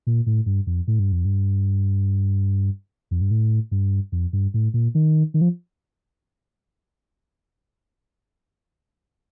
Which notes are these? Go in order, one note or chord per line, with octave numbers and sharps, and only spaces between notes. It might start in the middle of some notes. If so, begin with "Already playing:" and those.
A#2
A2
G2
F2
A2
G2
F2
G2
F2
G2
A2
G2
F2
G2
A2
A#2
D#3
D#3
F3